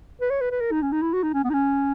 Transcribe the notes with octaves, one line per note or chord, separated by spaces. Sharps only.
B4
C#5
B4
B4
A#4
D#4
C#4
D#4
E4
F#4
D#4
C#4
B3
D#4
C#4